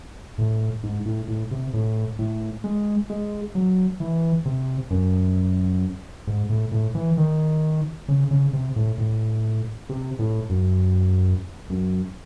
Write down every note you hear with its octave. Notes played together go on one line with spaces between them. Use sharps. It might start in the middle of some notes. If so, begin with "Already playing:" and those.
A2
G#2
A2
A2
C3
A2
A2
G#3
G#3
F#3
E3
C3
F#2
G#2
A2
A2
E3
D#3
C#3
C#3
C3
A2
A2
C3
A2
F#2
F#2